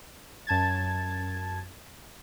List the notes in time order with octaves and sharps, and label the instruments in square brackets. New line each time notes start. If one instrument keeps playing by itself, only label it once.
[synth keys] F#2 A5 G#6 A6